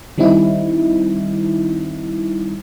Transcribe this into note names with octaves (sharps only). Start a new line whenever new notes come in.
D#3 G3 C4 D#4 E4